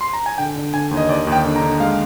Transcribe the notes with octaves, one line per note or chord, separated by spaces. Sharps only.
C6
A#5
G#5
D3 G5
D3
D3 G#5
D#2
D#5
D#2 D5
D#2
G5
D3
A#5
D3
G#3 F5